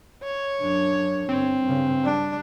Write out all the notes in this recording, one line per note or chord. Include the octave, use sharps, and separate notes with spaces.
C#5
F#2 D4
G1 C4
G2 C#3
G3 D4